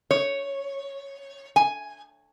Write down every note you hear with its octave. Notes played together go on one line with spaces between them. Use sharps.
C#5
G#5